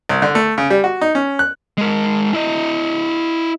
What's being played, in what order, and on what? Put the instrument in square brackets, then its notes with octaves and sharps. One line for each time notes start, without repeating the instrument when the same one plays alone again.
[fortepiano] C2
D3
A3
C#3
G3
F#4
D#4
C#4
F#6
[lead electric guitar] G#3 A#4
E4 D#5